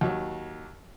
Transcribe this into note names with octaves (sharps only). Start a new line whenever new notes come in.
D#2 F#3